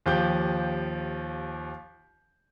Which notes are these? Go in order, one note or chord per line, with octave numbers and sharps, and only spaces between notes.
D#2 F3 G4 G6